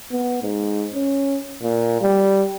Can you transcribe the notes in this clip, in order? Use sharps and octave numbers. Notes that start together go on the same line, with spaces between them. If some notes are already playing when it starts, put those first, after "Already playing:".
B3
G#2
C#4
A#2
G3